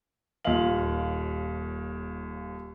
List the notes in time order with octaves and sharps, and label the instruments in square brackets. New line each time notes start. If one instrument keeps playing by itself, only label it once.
[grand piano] D#1 D#2 A#2 D#5 F5 F#7